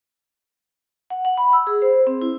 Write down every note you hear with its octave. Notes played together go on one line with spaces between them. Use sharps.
F#5
F#5
B5
E6
G#4
C5
C4
E4